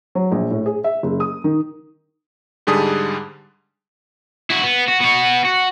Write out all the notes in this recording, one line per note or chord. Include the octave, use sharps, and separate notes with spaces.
F#3
A#1
A2
G#4
E5
F#1
D#6
D#3
G#2 D3 G3 G#4 A5 D#6
E4 F#4
B3
F#4
B3 F#4
F#4